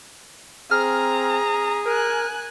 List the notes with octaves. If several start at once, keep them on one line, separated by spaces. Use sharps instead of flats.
C4 G#4 A#5 F6
A#4 G#5 F#6